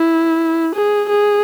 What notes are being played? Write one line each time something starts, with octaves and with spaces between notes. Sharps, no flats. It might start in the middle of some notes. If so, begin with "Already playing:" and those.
Already playing: E4
G#4
G#4